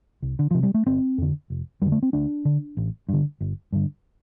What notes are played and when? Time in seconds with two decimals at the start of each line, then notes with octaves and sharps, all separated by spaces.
0.22 C2
0.39 D3
0.51 C3 F3
0.63 G3
0.74 A3
0.86 G1 C4
1.18 F2 D3
1.50 F1
1.82 F2 D3 G3
1.92 A3
2.03 C4
2.13 D2 D4
2.45 D3
2.77 A1
3.09 G2 D3
3.41 G1
3.72 G2 D3